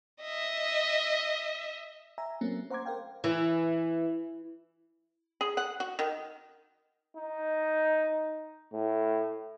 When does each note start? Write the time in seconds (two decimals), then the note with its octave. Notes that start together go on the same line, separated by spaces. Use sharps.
0.21 D#5 E5
2.18 E5 G#5 A#5
2.41 F#3 A3 A#3 C4 C#4
2.70 C5 F#5 A#5 C6 D6 G#6
2.86 A#4 C5 F5 G5
3.24 E3
5.41 G#4
5.57 F#5
5.80 F#4
5.99 D#3
7.17 D#4
8.73 A2